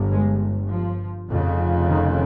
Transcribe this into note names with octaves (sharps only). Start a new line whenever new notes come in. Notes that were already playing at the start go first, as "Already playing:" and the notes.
Already playing: G1 G2
G#3
F3
F1 F2 C#3
D#3